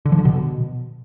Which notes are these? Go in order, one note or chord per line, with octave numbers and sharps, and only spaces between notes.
D3
F3
D3
B2